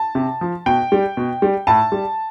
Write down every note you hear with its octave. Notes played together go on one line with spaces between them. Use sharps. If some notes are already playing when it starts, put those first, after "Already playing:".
Already playing: A5
C3
F3
B2 G5
G3
B2
G3
A2 A5
G3